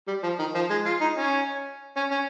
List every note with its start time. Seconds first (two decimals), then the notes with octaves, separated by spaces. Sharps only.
0.07 G3
0.23 F3
0.39 D#3
0.55 F3
0.70 G#3
0.86 F4
1.01 D#4
1.17 C#4
1.97 C#4
2.11 C#4